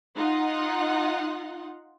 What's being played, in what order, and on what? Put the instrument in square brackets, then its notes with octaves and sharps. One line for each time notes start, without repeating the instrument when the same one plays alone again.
[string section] D#4 F4 F#5